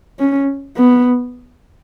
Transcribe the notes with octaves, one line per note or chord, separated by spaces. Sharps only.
C#4
B3